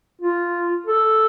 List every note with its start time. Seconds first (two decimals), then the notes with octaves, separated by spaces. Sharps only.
0.22 F4
0.86 A4